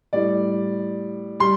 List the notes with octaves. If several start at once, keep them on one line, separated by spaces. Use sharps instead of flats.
A2 G3 D5
G3 C6